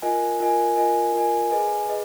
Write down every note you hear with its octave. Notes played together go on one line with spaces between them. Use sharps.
F4 A#4 D#5 G#5
F4 A#4 D#5 G#5
F4 A#4 D#5 G#5
F4 A#4 D#5 G#5
G#4 B4 D#5 G#5
G#4 B4 D#5